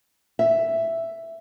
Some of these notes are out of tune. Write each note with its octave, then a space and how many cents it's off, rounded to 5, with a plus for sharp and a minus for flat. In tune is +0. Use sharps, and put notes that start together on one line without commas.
E5 +5